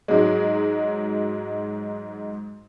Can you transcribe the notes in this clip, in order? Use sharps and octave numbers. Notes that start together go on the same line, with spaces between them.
G#2 F#3 G#3